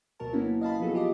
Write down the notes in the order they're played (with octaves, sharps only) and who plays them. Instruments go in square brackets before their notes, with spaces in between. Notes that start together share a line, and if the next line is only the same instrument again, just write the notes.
[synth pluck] D2 B2 F#3 A#4 A5
F#3 A#3 B3 C#4 E4 F#4
D#5 F5 A5 B5
F3 F#3 B3 F#4 G#4 A4
F4 G4 D#5 D6